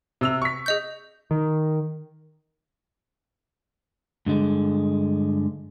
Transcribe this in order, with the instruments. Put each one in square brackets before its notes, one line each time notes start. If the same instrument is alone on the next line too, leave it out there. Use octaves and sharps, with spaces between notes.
[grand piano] C3 E6 F7
C#6 B6
[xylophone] G#4 D#5 G6
[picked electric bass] D#3
[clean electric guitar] G2 D3 G#3